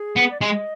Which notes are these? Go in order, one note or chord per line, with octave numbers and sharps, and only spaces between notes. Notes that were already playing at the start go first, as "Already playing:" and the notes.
Already playing: G#4
B3
D5
G#3 D#5